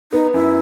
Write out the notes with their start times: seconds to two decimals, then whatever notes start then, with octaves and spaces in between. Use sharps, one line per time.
0.12 B3 D#4
0.34 F#2 E4